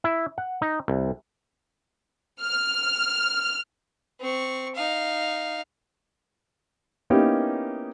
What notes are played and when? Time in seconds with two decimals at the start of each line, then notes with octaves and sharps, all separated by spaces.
0.04 E4
0.38 F#5
0.62 D#4
0.88 C2
2.41 F6
4.20 C4 C#6
4.75 D#4 F5
7.10 A#3 B3 C#4 D#4 E4 G4